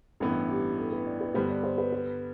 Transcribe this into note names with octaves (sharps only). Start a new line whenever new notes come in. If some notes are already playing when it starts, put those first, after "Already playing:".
A1 G2 E3 B3 E4
G4
A4
B4
D5
B4
G2 D3 G3 B3 C5
D5
C5
B4
B4